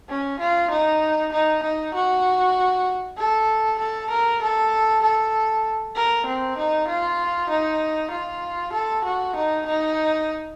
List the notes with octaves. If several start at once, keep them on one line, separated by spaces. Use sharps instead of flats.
C#4
F4
D#4
D#4
D#4
F#4
A4
A4
A#4
A4
A4
A#4
C4
D#4
F4
D#4
F4
A4
F#4
D#4
D#4